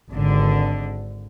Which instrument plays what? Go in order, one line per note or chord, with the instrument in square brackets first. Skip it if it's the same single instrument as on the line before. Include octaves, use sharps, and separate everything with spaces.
[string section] G#1 D3